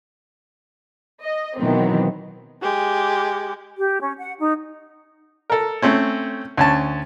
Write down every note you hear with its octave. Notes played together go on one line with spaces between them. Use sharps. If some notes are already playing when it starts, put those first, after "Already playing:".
D#5
B2 D#3 E3 F#3 B3 C4
G#3 G4
G4
C#4
F#5
D#4
A4 A#4
A3 C4 C#4
D2 C#4 A5